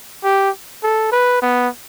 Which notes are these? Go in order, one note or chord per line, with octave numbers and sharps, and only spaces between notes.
G4
A4
B4
B3